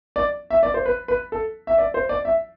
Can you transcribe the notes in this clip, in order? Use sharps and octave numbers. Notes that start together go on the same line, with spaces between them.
D5
E5
D5
C5
B4
B4
A4
E5
D5
C5
D5
E5